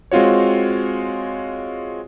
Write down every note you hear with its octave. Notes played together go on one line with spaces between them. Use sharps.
G#3 C4 F4 F#4 C#5